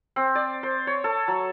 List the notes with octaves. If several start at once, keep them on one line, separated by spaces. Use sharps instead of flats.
C4
D5
C5
C#5
A4
F#3